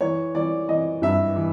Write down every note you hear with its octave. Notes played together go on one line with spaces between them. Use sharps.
E3 C#5
E3 D5
E3 D#5
G2 E5
E3